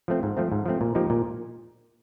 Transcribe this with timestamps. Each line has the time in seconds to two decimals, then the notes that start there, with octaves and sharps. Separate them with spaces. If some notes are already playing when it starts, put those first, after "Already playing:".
0.08 F3 A3 C4
0.23 G#2
0.37 F3 A3 C4
0.52 G#2
0.66 F3 A3 C4
0.81 A#2
0.95 F3 A#3 D#4 G4
1.10 A#2